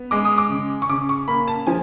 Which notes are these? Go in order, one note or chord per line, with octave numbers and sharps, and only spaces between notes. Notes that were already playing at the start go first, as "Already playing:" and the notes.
Already playing: B3
G#3 D6
D#6
D6
C#3
C#6
C#3 D6
C#6
A#3 B5
A5
F3 G#5